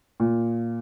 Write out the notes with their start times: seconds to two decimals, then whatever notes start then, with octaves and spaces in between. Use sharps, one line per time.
0.20 A#2